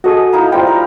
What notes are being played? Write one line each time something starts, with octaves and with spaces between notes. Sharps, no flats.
F#4 G#4 A4 D#5 D#6
A#3 D#4 E4
G3 F4 C5 G5
A#4